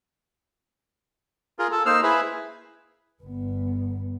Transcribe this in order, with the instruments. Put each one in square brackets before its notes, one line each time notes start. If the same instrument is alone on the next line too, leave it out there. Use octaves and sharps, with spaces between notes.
[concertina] F4 G#4 A#4
A4
A#3 D#4 C5 E6 F6
E4 G#4 B4
[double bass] G1 B3